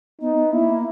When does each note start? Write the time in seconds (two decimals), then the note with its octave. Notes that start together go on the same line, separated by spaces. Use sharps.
0.21 B3 D#4
0.36 B3
0.52 A#3 E4